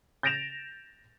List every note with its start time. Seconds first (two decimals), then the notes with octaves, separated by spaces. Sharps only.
0.23 G6 A6 A#6 D7 E7 F7